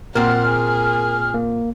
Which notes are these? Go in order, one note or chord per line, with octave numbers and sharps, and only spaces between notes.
A#2 C4 A#4 F#5 F6
G#4
A#3